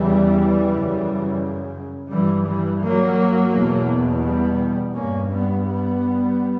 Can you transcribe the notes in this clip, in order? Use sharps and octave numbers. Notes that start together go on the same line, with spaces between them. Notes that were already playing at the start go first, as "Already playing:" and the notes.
Already playing: E2 C#3 E3 G3
F#2 C#3
G2 E3 G3
E3 G3
F#3 A#3
E2 B2
G3 B3
G2 A#3 C#4
G3 B3
G3 B3